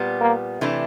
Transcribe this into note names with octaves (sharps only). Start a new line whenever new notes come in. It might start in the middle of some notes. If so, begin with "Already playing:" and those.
Already playing: A#2 G3 B3
A#3
C3 E3 A3 D4